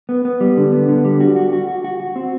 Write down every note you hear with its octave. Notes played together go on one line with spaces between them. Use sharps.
B3
B3
G3
D3
B3
D3
G3
F#4
F#4
F#4
F#4
F#4
F#4
C4